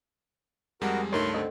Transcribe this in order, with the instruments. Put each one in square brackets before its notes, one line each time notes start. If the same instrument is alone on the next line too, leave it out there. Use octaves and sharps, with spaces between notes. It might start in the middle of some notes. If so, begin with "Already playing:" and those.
[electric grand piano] F2 G3 G#3 [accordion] F#4 A#4
[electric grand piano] C#2 G2 A3 [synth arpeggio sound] D#4 A#4 C#5 [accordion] C6
[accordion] D3 C4 [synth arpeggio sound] A4 D#5